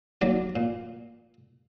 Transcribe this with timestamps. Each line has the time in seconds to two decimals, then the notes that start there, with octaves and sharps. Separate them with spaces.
0.21 D#2 F#3 D5
0.56 A#2